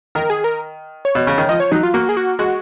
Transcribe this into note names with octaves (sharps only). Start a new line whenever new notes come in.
D#3 A#4
G#4
A#4
C#5
B2
C#3
D#3
F3 D#5
C#5
F#3 D#4
F4
A#3 F#4
G#4
F#4
G#3 F#4